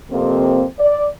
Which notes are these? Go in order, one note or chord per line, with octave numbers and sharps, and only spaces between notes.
F2 C3 A#3 C4
D5